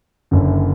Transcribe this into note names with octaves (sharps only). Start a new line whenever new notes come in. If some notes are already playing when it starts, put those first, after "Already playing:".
F#1 F#2 D3